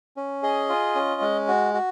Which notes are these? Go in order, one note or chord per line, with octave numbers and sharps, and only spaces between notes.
C#4
G#4 D#5
F4
C#4
G#3
F#4
F#4